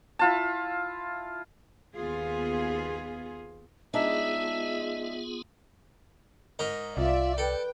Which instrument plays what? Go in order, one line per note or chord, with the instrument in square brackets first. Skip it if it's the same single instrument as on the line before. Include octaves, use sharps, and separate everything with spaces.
[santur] E4 F4 A5
[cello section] D#2 B3 F4 G#4
[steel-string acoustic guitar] G#3 D4 D#4 [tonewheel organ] B3 F4 G#4 [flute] E5
[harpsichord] G#2 A#4 D#5
[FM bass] C2 [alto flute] F4 [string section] D5 E5
[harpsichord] A4 [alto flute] B4 [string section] G5